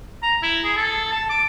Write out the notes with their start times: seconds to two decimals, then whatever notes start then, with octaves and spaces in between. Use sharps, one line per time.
0.23 A#5
0.43 E4
0.64 G#4
0.77 A4
1.12 A5
1.30 D6